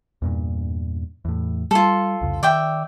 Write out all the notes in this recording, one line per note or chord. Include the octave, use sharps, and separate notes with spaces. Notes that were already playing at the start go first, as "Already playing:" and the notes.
E2 G2 A#2
E2 A2
G3 F4 A4
C2 F2 C#3
D#3 D5 E5 G5